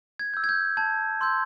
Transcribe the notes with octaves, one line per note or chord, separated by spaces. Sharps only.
G#6
E6 G6
G#6
G6
A5 G#6
C6 E6 G6